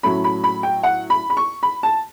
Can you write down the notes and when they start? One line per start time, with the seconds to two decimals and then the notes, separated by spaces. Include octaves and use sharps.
0.03 A2 F#3 A3 C#4 B5
0.24 B5
0.44 B5
0.63 G5
0.83 F#5
1.10 B5
1.30 B5
1.37 C#6
1.63 B5
1.83 A5